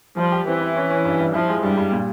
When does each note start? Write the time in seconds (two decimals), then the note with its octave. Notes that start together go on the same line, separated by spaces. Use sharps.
0.17 F3 G3
0.32 G4
0.46 E3 C4
0.61 E4
0.76 C#4
0.90 C#4
1.05 G2
1.19 G3
1.34 F3 E4
1.49 G#3
1.63 G2 G3
1.77 G2
1.92 A#2